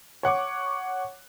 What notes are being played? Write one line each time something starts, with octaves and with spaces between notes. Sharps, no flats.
C#5 F#5 C#6 D6